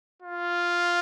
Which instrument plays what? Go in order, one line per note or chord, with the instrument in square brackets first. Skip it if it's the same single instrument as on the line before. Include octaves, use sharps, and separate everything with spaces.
[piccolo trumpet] F4